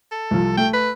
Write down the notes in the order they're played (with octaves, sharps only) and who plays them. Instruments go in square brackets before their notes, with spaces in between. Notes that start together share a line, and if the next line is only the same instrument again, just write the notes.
[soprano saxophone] A4
[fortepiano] C2 F3
[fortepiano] A3 [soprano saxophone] G5
[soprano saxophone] B4